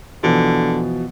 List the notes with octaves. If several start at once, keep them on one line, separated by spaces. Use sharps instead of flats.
B2 D3 E3 F3